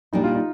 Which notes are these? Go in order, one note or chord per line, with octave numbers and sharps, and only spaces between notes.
A#2 G3 A#3 D4 D#4
F4
D#4